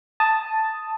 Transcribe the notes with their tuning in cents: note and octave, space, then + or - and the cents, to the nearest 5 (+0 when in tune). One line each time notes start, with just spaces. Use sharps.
A5 +0 D#6 +0